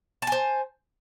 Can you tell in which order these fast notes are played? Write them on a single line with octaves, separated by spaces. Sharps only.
A5 G#5 C5